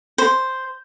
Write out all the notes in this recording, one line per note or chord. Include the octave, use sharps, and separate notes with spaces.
C5